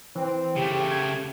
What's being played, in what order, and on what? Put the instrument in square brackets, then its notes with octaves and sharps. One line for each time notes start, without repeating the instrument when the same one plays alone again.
[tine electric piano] E3 [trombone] C4
[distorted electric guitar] C#3 A3 [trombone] G4
[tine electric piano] G#6